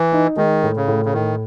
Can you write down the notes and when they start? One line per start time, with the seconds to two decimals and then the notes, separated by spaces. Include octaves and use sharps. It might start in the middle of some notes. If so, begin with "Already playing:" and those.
Already playing: E3
0.12 D#4
0.37 D#3 G#3
0.63 A2
0.76 C#3
0.88 A2
1.05 C#3
1.13 A2 D#3